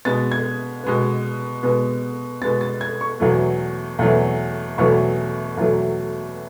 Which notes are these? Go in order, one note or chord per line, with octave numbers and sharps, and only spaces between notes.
B2 G#3 B3 A6
G#6
B2 G#3 B3
B2 G#3 B3
B2 G#3 B3 A6
A6
G#6
C#6
E2 B2 F#3 A3
E2 B2 F#3 A3
E2 B2 F#3 A3 C#6
E2 B2 F#3 A3